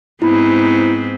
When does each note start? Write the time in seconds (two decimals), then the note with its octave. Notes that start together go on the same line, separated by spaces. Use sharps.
0.22 G#2 B3 C4 E4 B5